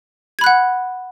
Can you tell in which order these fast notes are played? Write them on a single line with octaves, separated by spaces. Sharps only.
G#6 B5 F#6 F#5